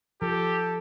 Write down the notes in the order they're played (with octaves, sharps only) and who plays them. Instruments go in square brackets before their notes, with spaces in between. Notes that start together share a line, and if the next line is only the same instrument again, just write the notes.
[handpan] F3 [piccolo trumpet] G4 [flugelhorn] A4